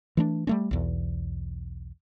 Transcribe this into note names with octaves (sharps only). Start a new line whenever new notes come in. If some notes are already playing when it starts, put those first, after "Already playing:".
E3 A3 D4
G3 A3 C#4
B1 E2